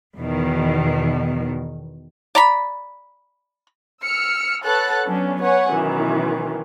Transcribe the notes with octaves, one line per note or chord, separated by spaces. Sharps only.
E2 B2 D#3
D5 A#5 B5
E6 F6 C#7
A4 B4 C#5 F#5 F#6 A6
F#3 B3 C#4 D4
B4 C#5 F#5 G#5
F#2 B2 D#3 E3